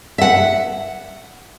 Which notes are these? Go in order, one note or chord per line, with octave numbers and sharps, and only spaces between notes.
E5 F#5